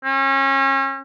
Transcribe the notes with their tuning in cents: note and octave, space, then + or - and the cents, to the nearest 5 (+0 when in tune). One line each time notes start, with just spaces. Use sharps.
C#4 -35